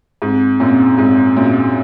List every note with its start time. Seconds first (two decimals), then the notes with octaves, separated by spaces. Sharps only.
0.22 G#2 C4
0.60 F#2 A#2 C4
0.97 G#2 C4
1.36 F#2 A#2 F#4